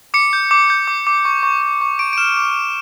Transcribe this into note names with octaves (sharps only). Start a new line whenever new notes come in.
D6 C#7
G6
D6
G6
D6
D6
C#6
C#6
C#6
C#6
C#6 D7
D7
F6 E7
D6
D6